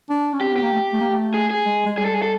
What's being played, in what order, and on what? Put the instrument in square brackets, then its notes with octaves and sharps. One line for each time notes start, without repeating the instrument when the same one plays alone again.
[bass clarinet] D4
C#4
[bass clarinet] C4 [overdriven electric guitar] G4
[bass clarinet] B3 [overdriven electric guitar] G4
[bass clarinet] A#3
A3
A3
A#3
A3
[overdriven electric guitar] G#4
G#4
[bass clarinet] G#3
G#3
[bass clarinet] G3 [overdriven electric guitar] G#4
[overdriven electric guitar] A4
G#4
A4